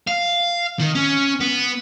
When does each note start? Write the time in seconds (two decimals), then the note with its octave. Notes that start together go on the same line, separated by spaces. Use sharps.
0.07 F5
0.79 D#3
0.95 C#4
1.41 B3